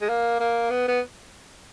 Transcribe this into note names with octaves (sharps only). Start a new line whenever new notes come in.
G#3
A#3
A#3
B3
B3